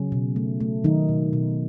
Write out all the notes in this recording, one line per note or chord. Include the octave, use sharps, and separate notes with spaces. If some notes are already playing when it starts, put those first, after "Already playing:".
Already playing: C#3 F#3 C#4
B2
A3
A3
D#3 F#3 D#4
B2
B2